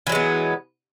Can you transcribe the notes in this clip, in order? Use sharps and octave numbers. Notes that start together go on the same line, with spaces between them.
E3 F#3 G#3 B3